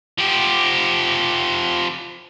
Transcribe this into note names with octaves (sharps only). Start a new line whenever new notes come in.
F3 G4